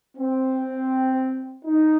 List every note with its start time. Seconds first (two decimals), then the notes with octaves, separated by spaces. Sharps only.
0.18 C4
1.65 D#4